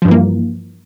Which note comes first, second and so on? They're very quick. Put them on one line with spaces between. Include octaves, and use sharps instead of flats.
F3 G2 E3 A#3